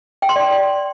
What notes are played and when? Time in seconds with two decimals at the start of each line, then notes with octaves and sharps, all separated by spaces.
0.22 G5
0.29 C6
0.36 D5